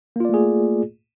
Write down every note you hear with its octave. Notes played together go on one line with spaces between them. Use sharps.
A3 A#3 F4 G#4 D5